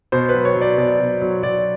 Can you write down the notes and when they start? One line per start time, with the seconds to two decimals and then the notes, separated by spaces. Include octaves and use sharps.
0.12 B2 C5
0.29 B4
0.35 F#3
0.45 C#5
0.56 F#3
0.61 D5
0.78 B2 D5
1.00 B2
1.22 F#3
1.43 F#3 D5